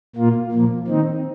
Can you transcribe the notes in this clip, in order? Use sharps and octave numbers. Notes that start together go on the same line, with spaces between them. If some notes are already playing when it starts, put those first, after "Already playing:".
A#2 A#3 F4
A#2 F3 A#3
D#3 C4 D#4